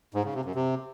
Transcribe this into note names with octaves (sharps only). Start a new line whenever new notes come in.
G#2
C#3
C3
F#2
C3